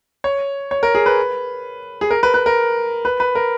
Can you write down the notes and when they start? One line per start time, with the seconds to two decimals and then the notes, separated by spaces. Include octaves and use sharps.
0.24 C#5
0.71 C#5
0.83 A#4
0.95 G#4
1.06 B4
2.01 G#4
2.11 A#4
2.23 B4
2.34 B4
2.46 A#4
3.05 B4
3.20 B4
3.35 A#4